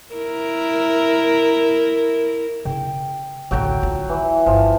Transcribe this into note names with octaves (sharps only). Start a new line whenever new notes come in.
E4 A#4
C#3 G5
A1 D2 F#3 G5
F4
E3
G1 F3